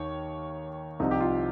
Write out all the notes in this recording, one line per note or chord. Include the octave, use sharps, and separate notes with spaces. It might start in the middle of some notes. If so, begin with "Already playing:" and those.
Already playing: D#2 D#3 C#5
C2 C3 F3 D#4
G4
F4